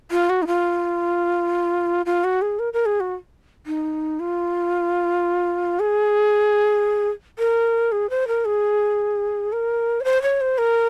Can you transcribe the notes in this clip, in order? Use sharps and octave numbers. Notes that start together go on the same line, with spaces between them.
F4
F#4
D#4
F4
F4
F#4
G#4
A#4
A#4
G#4
F#4
D#4
F4
G#4
A#4
G#4
C5
A#4
G#4
A#4
C#5
C5
C#5
C5
A#4